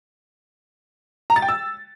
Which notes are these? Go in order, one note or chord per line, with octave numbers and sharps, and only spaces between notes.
A#5
A6
G5
E6